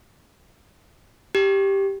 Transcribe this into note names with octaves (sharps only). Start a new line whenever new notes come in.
G4